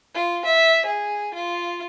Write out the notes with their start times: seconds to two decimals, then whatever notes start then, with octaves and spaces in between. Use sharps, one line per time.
0.14 F4
0.45 E5
0.86 G#4
1.34 F4